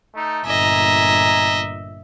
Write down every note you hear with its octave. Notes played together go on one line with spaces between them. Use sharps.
A3 D#4
G1 A#2 D#5 E5 G#5 A#5